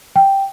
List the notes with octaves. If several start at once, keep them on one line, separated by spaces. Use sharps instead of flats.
G5